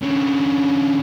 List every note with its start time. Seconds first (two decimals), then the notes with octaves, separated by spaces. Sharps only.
0.02 D3 C#4